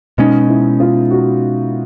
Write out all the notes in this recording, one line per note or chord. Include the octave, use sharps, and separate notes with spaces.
B2 G#3 C#4 D#4
E4
F4
F#4